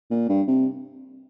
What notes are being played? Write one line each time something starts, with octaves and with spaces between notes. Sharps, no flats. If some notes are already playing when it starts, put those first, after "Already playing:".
A#2
G2
C3